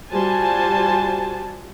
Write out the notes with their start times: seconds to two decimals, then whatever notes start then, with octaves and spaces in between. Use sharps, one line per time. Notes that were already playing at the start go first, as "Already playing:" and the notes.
0.11 G3 F4 F#4 C5 G#5 A5